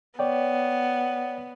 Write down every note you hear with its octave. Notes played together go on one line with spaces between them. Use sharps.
B3 C#5 D5 G5